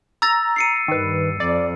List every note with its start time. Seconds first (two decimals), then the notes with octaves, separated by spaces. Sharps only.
0.22 A#5 E6 A6
0.56 C7 C#7 D#7
0.88 G2 D#3 B4
1.40 F2 D5